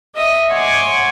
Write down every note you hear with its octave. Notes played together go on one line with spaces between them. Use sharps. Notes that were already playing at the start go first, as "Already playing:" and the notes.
D#5 E5 D#6
C#5 F#5 G#5 C6 D6